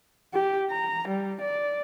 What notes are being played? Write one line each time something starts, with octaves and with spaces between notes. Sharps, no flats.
G4
A#5
G3
D5